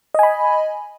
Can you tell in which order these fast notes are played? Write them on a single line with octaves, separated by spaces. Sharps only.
D#5 G#5 B5